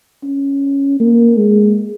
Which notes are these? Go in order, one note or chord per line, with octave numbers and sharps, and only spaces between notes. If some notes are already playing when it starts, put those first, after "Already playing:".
C#4
A#3
G#3